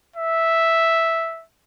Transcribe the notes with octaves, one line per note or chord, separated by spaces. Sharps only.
E5